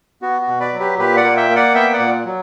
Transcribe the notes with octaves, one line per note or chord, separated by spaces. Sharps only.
B3 F#4
F#4
B2
B4 D5
F#3
G4 B4
A#2 G4 B4
D5 F#5
A#3
E5 G5
A#3
D5 F#5
B3 E5 G5
D5 F#5
A#2
F#3